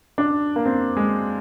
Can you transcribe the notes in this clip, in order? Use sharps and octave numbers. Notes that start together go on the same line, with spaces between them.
D4
A#3
C4
G#3